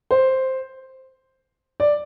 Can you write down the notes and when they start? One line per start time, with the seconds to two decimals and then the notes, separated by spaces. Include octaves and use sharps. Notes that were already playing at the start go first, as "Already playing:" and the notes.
0.11 C5
1.80 D5